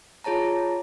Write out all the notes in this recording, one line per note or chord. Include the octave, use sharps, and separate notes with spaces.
F4 G#4 C#5 A5 A#5